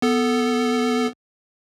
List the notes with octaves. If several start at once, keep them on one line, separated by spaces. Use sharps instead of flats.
B3 A4